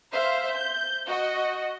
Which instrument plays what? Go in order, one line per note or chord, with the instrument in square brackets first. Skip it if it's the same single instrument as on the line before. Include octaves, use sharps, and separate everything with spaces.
[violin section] C5 E5 F5
G6
F#4 D#5